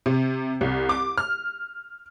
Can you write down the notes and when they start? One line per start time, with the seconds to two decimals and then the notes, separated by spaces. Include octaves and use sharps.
0.06 C3
0.61 C2
0.89 D6
1.18 F6